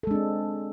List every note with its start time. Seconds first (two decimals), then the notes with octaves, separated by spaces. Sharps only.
0.03 A4
0.07 G#3
0.11 D4
0.15 C4